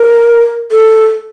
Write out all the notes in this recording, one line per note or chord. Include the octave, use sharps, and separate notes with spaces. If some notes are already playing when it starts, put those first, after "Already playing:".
Already playing: A#4
A4